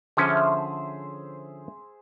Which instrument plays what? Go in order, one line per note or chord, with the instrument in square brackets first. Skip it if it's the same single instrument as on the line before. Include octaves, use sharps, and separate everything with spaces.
[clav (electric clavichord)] D3 F3 C#4 [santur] G#4 C5 E5